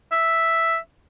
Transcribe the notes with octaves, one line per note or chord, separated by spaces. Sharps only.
E5